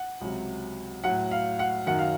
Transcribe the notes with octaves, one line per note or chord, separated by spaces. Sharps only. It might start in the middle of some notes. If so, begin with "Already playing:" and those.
Already playing: F#5
C#2 C3 F#3
A2 F#3 F#5
F5
F#5
F#2 D#3 F#3 F#5
F5